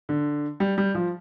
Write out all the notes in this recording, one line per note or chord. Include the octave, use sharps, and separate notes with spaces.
D3
G3
G3
F3